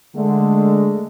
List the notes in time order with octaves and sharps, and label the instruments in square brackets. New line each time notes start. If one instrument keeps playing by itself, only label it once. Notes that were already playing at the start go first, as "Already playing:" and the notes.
[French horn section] D3 G#3 A3